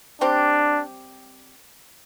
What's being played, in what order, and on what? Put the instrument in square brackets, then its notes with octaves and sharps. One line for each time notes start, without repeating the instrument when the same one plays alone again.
[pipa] G3 C4 G4 [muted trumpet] D4